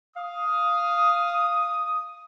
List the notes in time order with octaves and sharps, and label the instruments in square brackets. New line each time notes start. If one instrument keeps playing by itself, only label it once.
[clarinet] F5 [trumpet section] D#6